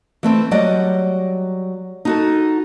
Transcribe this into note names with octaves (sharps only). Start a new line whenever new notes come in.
E3 A3 C4
F#3 G3 D5 D#5 F#5
D#4 F#4 A4